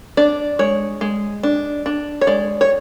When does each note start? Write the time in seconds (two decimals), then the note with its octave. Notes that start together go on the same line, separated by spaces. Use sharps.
0.17 D4 D5
0.59 G#3 C#5
1.01 G#3
1.43 D4
1.86 D4
2.21 C#5
2.27 G#3 D5
2.61 C#5